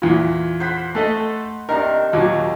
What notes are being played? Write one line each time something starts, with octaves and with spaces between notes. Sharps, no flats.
E2 A#2
C5 F#5 B5
A3 A4 D#5
C3 D#3 D4 A#4
D#2 A#2 F#3